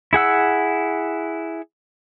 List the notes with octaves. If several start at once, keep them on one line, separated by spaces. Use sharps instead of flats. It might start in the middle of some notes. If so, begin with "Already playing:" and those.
E4 G#4 F#5 E6